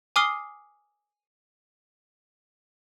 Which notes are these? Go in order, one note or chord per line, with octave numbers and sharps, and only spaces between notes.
G#5 D6 D#6 F6 C7 G7